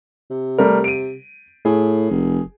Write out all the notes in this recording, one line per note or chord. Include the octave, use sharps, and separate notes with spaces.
C3
G3 A3 A#4
D7 D#7
A2 G#4
F1